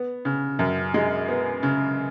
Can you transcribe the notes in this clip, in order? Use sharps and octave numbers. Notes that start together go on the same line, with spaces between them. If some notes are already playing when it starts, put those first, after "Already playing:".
Already playing: B3
C#3
F#2
G#3
B3
C#3